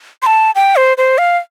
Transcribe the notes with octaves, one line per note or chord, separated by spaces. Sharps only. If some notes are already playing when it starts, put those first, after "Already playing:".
C6
A5
G5
C5
C5
F5